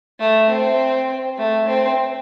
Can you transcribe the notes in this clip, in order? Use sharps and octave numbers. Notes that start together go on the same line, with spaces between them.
A3
C4
A3
C4